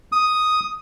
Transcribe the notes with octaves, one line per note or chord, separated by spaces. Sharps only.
D#6